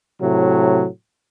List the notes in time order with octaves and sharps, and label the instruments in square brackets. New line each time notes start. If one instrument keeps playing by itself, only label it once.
[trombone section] A2 C3 F#3